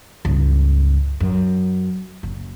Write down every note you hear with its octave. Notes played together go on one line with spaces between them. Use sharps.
C#2 G2
F#2
F#1